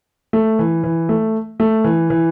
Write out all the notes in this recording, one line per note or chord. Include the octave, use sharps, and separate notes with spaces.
A3
E3
E3
A3
A3
E3
E3